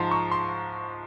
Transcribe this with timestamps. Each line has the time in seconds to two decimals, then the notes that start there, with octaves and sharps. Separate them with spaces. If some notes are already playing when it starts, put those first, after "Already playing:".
Already playing: G#2 F3 G#3 A5 A#5 C6
0.11 C#6
0.31 C6